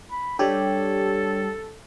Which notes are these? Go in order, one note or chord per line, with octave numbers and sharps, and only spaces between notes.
B5
G3 D4 G4 A4 C#5